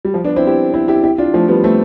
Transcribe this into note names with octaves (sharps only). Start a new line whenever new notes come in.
G3
F3
B3 D4
C4 E4
E4 G4
C4 E4
E4 G4
E4 G4
D4 F4
F3 A3
G3 B3
A3 C4